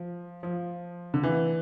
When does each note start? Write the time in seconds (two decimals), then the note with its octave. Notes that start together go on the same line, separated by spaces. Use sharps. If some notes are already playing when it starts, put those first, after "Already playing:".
Already playing: F3
0.43 F3
1.14 D3
1.23 E3